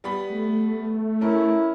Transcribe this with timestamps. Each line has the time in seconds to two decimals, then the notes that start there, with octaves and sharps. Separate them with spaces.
0.04 G3 B3 B5
0.30 A3
1.21 C#4 E4 A#4